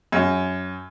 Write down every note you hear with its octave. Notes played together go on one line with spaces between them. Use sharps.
F#2